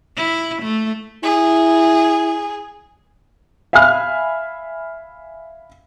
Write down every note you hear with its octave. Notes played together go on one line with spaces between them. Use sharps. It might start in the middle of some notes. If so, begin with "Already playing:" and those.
E4
A3
E4 G#4
E5 F5 G#5 B5 F6